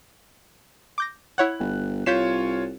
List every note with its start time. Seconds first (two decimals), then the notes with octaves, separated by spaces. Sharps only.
0.98 D6 G6 A#6
1.38 E4 C#5 F#5 F#6
1.60 G1
2.06 C2 F4 C#5 G6 B6 C7 E7